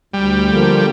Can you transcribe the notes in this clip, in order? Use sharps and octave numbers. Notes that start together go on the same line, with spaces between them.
D2 G3
D3 F3 A#3